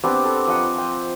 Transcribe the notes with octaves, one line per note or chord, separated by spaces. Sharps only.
B3 C4 D4 G4
A4
F3 D#5 F#5 A#5
G5